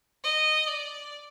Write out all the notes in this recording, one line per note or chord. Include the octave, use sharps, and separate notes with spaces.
D#5
D5